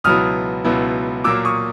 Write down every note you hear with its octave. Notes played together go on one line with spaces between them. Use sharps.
C#2 B2 F#3 B3 E4 D#6 F6
C#2 B2 F#3 B3 E4
A#2 F#3 A#3 D6 E6
C#6 D#6